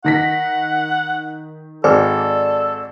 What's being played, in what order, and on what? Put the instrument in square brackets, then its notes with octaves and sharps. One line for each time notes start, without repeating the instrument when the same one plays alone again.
[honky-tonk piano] D#3 A#6 B6 [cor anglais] F#5
[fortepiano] G#1 F6 [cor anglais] A4 [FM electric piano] D5